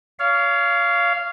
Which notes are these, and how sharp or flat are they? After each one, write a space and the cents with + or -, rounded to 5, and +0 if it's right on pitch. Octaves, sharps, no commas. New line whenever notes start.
C#5 +30 F5 -10